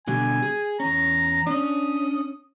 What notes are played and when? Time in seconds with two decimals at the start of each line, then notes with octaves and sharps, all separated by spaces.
0.07 B2 D3 G3 G#5
0.43 G#4
0.80 E2 C#4 A#5
1.47 C#4 D4 D#6